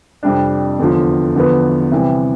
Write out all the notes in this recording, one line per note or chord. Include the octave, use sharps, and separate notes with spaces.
F2 C3 G3 D4
E2 D3 F3
E2 D3 F3 B3
C3 E3 G3